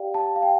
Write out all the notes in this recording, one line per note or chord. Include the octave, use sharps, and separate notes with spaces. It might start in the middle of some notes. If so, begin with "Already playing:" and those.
Already playing: G4 D5 F5 G5
A5
F5
G5